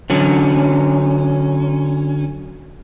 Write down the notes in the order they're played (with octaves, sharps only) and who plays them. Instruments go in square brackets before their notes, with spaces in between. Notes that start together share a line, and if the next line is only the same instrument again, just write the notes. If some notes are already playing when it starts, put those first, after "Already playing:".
[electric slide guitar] D3 F#3 C#4